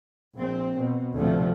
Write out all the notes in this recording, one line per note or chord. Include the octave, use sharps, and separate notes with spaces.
A#1 C4
B2
D2 A2 C3 F3 A3